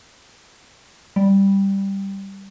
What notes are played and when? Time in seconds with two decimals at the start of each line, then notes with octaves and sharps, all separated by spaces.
1.16 G3